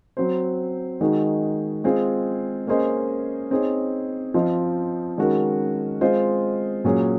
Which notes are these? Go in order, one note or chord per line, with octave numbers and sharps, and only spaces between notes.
F#3 C4 F#4 C5
D#3 G#3 D#4 F#4
G#3 C4 F4 G#4
A#3 C#4 G#4 C5 D#5
C4 D#4 G#4 C#5
F3 C4 F4 C5 D#5
D#3 G#3 C#4 F#4 A#4
G#3 C4 F4 C5 D#5
A#2 F#3 C#4 G#4 C#5